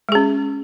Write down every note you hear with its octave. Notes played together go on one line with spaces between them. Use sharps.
G#3 C#4 G#4